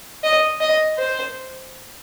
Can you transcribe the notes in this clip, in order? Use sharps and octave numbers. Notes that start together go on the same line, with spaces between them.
D#5
D#5
C5